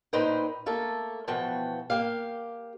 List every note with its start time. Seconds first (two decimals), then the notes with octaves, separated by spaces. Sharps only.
0.13 A#2 D#4 B4 C5 G5
0.66 A3 A#3 A4
1.27 B2 E3 F3 F#4 G5 A5
1.90 A#3 G4 F5